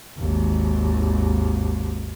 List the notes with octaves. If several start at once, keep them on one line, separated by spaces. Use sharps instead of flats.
G#1 D#2